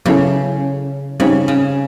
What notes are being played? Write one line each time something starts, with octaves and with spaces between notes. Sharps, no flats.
C#3 F#3 B3 E4 A4
C#3 G3 C4 D#4 G4
C#3